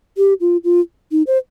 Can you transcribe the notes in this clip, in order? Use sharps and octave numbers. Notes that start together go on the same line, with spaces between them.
G4
F4
F4
D#4
C5